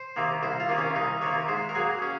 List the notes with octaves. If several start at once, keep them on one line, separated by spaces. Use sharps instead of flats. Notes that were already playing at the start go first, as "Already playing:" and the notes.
Already playing: C5
C3 D#3 A#3
C2 C5
F4
C3 D#3 A#3
C#4
C2 D#4
C3 D#3 A#3 C#5
G#2 C5
A#4
F#3 A#3 G#4
C#4